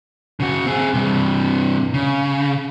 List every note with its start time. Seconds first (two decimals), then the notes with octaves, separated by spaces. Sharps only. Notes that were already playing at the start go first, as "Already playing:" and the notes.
0.40 C#3 F#4
0.66 C4 G#4
0.94 G2 C3
1.94 C#3